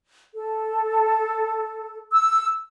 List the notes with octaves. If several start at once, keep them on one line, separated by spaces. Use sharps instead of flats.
A4
E6